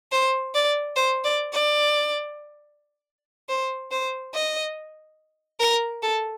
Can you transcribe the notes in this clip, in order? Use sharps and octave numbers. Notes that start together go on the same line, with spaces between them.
C5
D5
C5
D5
D5
C5
C5
D#5
A#4
A4